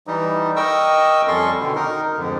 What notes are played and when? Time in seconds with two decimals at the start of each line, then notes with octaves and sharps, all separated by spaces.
0.07 E3 G3 D#4
0.56 A#4 D#5 G5 C#6 D#6 E6
1.28 F2 G3 C#4 A4 C6 C#6
1.59 B2 D3 D#3
1.76 D#4 A#4
2.18 F2 G#2 D3